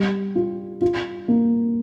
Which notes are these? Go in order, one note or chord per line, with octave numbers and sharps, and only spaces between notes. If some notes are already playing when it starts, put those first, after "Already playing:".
Already playing: G3
F4
F4
A#3